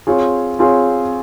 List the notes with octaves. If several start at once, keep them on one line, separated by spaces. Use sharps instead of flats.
C4 F4 G#4 C#5
C4 F4 G#4 C#5